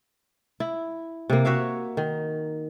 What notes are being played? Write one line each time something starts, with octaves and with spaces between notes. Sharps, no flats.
E4
C3 A#3
F#4 C#5 E5 F5
D#3